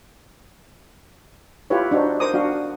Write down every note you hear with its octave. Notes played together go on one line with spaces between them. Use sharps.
E4 F4 G4 B4 C#5
D4 D#4 F#4 C5
A#4 C5 A#5 D6 D#6
D4 F#4 F5